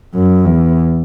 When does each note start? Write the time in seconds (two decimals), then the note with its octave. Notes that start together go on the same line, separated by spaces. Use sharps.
0.14 F#2
0.45 E2